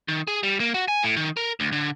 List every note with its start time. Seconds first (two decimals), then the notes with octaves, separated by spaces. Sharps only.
0.08 D#3
0.27 G#4
0.43 G3
0.60 A#3
0.74 F#4
0.88 G#5
1.03 A2
1.17 D#3
1.37 A#4
1.60 D2
1.72 D3